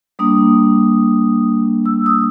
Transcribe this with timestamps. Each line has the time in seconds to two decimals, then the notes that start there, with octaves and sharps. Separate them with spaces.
0.19 G3 A#3 D4 D#6
1.86 E6
2.06 D#6